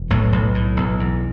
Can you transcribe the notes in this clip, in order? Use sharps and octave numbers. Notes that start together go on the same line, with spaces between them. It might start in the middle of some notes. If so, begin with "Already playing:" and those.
Already playing: E1
B1 A2 A3
B1
A2
B1
E2